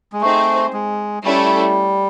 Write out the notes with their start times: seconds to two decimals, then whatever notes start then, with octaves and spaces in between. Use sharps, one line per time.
0.13 G#3
0.21 A3 C4 D#4 G#4 C5
0.73 G#3
1.23 G3 A3 C#4 E4 A4